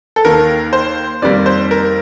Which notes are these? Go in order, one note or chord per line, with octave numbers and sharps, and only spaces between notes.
A4
D#2 D#3 A#3 A#4
C5
F2 D#3 G3 A#3 D5
C5
A#4